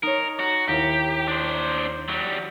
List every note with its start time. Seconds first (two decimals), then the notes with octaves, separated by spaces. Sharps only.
0.03 D#4 A#4 C#5
0.39 F#4 A#5
0.68 D#2 E4 G4 A#4
1.28 D4 C5
2.08 F#3 G3 E6